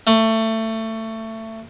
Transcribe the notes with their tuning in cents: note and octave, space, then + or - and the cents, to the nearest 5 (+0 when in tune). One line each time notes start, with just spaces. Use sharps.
A3 +20